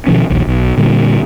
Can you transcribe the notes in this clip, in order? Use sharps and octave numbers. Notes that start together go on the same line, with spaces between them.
B2 D#3 F3 C#4
A#1 D#2
B1
A#2 D3 G3